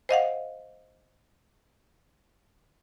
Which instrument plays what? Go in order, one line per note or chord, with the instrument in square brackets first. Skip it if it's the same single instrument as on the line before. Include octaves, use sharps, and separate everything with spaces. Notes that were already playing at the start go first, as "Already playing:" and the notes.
[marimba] C5 D#5 F5 F#5